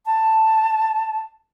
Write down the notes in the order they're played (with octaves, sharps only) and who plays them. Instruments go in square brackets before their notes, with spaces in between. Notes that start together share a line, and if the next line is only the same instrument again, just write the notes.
[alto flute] A5